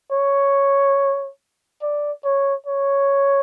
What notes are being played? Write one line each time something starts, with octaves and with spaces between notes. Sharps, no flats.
C#5
D5
C#5
C#5